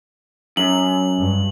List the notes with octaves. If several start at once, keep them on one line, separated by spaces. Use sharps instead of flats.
F#2 F#7
G2